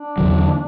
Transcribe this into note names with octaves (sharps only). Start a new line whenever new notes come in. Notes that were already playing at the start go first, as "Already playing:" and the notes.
Already playing: D4
E2 D3 F#3